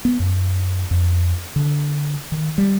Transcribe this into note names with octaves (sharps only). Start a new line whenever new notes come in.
B3
F#2
F2
D3
D#3
G3